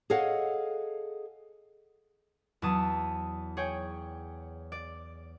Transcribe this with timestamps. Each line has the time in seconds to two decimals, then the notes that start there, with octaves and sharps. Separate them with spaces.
0.10 G#4 A4 C#5 D#5 F5 F#5
2.62 E2 F#3 A5 D#6
3.57 G#4 C#5 G5
4.72 D5